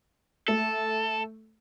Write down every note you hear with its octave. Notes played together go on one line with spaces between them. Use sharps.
A3 A4